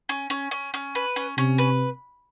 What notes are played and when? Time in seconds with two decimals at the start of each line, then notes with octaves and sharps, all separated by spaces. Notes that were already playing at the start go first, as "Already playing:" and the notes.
0.09 C#4
0.30 C#4
0.51 C#4
0.74 C#4
0.95 B4
1.16 C#4
1.37 C3 C#4
1.58 B4